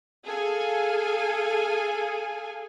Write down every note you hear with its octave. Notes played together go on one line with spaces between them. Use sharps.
G#4 A4 F5 G#5